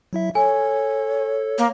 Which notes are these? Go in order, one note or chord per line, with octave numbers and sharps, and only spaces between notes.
F#3 E4 E5
A4 C#5 G#5
A#3